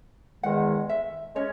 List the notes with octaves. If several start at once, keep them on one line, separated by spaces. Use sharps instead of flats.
E2 D#3 G#3 F#5
E5
G#3 C#4 C#5